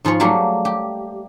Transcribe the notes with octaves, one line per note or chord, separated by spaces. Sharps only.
G#2 F3 G#4 C#5
F#3 G3 A3 A#3 G#4
G4